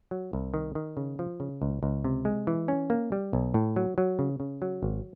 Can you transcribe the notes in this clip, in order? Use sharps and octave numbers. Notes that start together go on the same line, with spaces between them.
F#3
C2
D#3
D#3
C#3
F3
C#3
C#2
C#2
C3
G#3
E3
C#4
A#3
G3
B1
A2
F#3
F#3
C#3
C#3
F#3
G#1